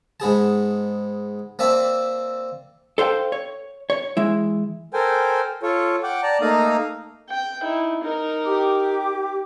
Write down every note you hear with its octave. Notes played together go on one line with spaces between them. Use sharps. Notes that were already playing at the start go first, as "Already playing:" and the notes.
G#2 B3 G#4 A5
A#3 C4 D5 E5 A5
A4 C5 F5 G5
C#5
C#5
E3 G#3 E4
A4 A#4 C5 G5 G#5
F4 A4 C#5
F#5 G5 D6
D5 A5 A#5
A3 A#3 D#4 F5 A#5 D#6
G5
D#4 E4
D#4 A#4
G4 D6